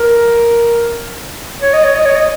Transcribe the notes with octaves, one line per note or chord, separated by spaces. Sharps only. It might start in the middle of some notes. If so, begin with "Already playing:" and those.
Already playing: A#4
C#5
D#5
C#5
D#5
C#5
D#5